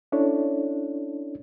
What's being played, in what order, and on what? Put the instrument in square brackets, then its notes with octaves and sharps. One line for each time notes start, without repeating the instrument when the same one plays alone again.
[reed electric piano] C#4 D4 E4 A4 C#5